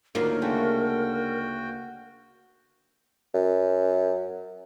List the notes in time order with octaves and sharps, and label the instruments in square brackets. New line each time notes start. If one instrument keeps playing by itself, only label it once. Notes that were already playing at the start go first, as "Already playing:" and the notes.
[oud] D2 A#3 F4 [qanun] D#3 F#3 D#4 [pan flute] A#4
[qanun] C#3 G#3 A3 [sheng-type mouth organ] F#4 G5
[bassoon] F#2